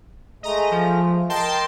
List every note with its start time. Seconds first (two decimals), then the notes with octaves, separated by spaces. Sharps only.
0.43 G#3 A3 D#5 A#5
0.71 F3
1.30 A#4 D#5 G5 A5 C6